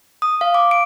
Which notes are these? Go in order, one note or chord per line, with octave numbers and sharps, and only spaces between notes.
D#6
F5
D6
D7